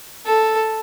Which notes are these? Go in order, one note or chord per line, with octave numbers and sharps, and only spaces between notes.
A4